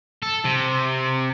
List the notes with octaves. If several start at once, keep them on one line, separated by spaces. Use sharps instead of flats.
A4
C3